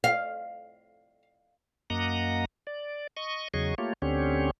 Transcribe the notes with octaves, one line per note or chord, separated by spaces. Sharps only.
F5
F#2 A#3 D#5 F#5 A#5
D5
D#5 C#6
E2 C#3 F#3 G#4 D#5 C#6
A3 A#3 F4 G4 C#5
D2 D3 C4 C#4 G4 C#5